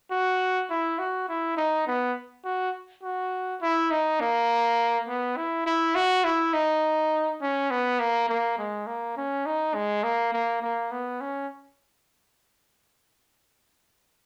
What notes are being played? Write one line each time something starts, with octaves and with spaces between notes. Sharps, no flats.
F#4
E4
F#4
E4
D#4
B3
F#4
F#4
E4
D#4
A#3
B3
E4
E4
F#4
E4
D#4
C#4
B3
A#3
A#3
G#3
A#3
C#4
D#4
G#3
A#3
A#3
A#3
B3
C#4